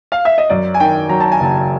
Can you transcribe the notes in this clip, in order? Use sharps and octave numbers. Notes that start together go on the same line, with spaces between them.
F5
E5
D#5
F#2 D5
G#5
D#3 G5
F#3 A#5
A5
G#5
F#1 A5